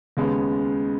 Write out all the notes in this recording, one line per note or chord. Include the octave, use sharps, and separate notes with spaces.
D#2 C#3 G#3 B3